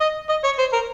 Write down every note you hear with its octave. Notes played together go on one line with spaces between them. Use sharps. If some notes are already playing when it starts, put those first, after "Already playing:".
D#5
D#5
C#5
C5
A#4